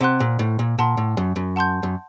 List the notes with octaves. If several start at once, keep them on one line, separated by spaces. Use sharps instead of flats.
C3 C5 F#5 C6 F#6
A#2
A2
A#2
A#2 F#5 A5 C6
A2
F#2
F#2
F#5 A5 C6 G6
F#2